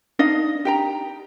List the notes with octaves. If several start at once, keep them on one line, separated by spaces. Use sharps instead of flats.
D4 D#4 D#5 F5
G4 G5 A#5